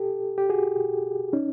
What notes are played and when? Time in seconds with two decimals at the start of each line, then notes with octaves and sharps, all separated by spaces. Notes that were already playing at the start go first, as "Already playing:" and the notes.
Already playing: G4 A4
0.38 G4
0.50 F#4 G#4
1.33 C#4 D#4